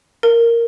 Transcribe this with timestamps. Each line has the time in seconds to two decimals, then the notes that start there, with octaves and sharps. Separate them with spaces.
0.23 A#4